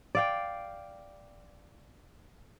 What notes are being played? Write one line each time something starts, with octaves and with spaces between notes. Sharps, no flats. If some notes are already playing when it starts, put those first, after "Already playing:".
D5 F5 G5